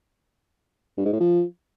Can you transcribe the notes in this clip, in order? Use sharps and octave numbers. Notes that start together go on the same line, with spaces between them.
G2
G#2
A2
F3